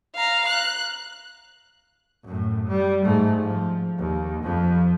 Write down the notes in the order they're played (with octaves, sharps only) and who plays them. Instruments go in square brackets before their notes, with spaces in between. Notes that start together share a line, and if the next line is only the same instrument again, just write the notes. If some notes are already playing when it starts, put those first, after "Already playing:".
[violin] F5 A#5
F#6
[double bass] F#2 A2
G3
G#2 A3
F3
D#2
F2 F3